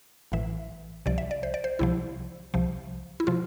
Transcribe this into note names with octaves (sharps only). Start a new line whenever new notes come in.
A1 A2 E3 E5
C2 C3 F3 D5
E5
D5
C5
D5
C5
C2 C3 F3 E4
C2 C3 F3
E4
C3 F3 F4